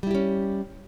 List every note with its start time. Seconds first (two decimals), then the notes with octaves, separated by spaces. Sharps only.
0.03 G3
0.07 E4
0.11 G4
0.15 C#4